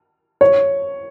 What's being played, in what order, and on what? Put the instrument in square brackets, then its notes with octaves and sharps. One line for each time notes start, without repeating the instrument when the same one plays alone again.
[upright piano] C#5